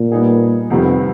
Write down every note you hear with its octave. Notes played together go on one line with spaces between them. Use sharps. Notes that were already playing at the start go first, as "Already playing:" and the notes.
Already playing: A#2
G3 B3 D#4 G#4
C2 F2 C3 D#3 G3 B3